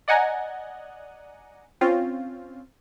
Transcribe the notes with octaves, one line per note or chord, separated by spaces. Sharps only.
D5 D#5 F#5 G#5 A#5
C4 C#4 F4